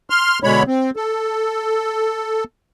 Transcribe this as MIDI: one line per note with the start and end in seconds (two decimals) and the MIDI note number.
0.10 0.39 84
0.10 0.39 89
0.43 0.63 47
0.43 0.63 50
0.43 0.63 56
0.43 0.63 73
0.43 0.63 83
0.67 0.90 60
0.96 2.44 69